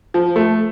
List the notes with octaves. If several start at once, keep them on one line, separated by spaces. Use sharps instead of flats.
F3
A3